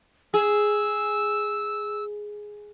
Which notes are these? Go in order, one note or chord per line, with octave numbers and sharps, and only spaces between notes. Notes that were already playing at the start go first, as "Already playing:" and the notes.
G#4 E6